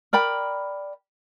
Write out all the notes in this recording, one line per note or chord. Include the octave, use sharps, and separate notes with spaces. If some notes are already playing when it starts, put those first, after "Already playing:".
A#4 D5 G5 B5